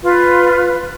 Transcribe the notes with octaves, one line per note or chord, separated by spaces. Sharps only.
F4 B4